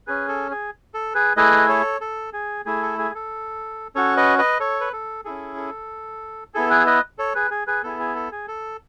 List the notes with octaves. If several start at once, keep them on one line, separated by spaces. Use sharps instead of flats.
C#4 G#4 B4
A4
G#4
A4
G#4 B4
A3 E4 G#4 B4 D#5
A4 C#5
A4
G#4
A3 E4 G#4
A4
G#4
A4
C#4 F#4 A4 C#5
B4 D#5
B4 D#5
A4 C#5
B4
A4
C#4 E4 G#4 A4
A4
B3 E4 G#4 A4
G#4 B4
B4 D#5
A4 C#5
G#4 B4
G#4
G#4 B4
B3 E4 G#4 A4
G#4
A4
G#4
A4